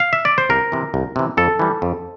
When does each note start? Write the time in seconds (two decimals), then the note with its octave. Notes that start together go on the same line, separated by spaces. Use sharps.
0.00 F5
0.13 E5
0.25 D5
0.38 C5
0.49 C2 A#4
0.72 C3 E3
0.94 C2
1.16 C3 E3
1.37 F2 A4
1.59 E3 G3
1.82 F2